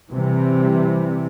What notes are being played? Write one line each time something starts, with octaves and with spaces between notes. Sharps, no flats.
C3 E3 G3